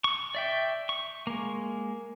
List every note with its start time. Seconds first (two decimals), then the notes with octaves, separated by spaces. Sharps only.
0.04 C#6
0.35 D5 E5 G5
0.89 C#6
1.27 G#3 A#3